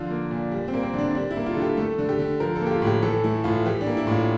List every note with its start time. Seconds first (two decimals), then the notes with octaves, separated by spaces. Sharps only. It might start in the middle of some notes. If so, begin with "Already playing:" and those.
Already playing: D3 F3 F4
0.10 A#3
0.31 A#2
0.52 G3
0.68 C4
0.74 A#3
0.83 C4
0.94 D3 D4
1.15 G3 D4
1.31 E4
1.36 A#3
1.46 F4
1.54 D3 A4
1.62 G4
1.77 A3 A4
1.98 D3
2.09 G4
2.19 D3
2.40 F3 A#4
2.56 A4
2.61 A#3
2.67 G4
2.71 F4
2.82 A2 G4
3.02 E3 A4
3.24 A3 E4
3.44 A2 F4
3.65 E3 G4
3.81 D4
3.86 A#3
3.97 E4
4.07 A2 F4